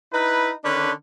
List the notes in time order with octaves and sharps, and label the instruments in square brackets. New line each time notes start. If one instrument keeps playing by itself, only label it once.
[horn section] D#4 E4 B4
D3 D#3 C#4 D4 B4